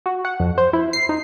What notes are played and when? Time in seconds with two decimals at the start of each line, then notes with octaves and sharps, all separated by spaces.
0.06 F#4
0.25 F#5
0.40 F2
0.58 C5
0.73 E4
0.93 C7
1.09 D#4